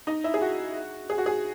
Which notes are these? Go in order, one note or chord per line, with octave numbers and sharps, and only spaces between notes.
D#4 D#5
E4 E5
G#4
F#4
G#4
F#4
G#4